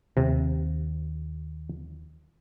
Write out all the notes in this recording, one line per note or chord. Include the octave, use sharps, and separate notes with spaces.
D#2 C3